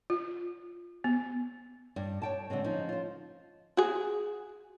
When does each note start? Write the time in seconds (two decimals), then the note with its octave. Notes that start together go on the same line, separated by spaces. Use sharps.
0.10 F4
1.04 B3
1.96 G2
2.22 C#5 G5 A5
2.50 D3 F#3 G#3 C4
2.64 F3 C#4 D#4
2.89 F4 C5
3.77 F#4 G#4